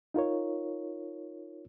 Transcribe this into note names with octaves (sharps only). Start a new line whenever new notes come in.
D#4 F4 A#4 C#5